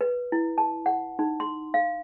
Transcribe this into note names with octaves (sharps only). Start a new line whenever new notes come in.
B4
E4
A5
F#5
D#4
C6
F5